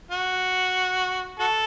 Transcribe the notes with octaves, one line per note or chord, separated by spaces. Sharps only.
F#4
F#4 A4